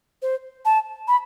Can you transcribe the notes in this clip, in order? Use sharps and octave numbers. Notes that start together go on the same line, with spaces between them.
C5
A5
B5